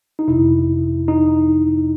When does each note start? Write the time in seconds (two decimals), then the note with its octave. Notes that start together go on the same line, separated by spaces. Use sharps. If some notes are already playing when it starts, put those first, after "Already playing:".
0.19 D#4
0.28 G1 F2 C3 E4
1.08 D#4